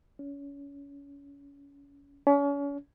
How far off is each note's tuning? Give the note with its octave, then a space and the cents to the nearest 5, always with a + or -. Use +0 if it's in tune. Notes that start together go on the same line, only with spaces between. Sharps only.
C#4 +30
C#4 +40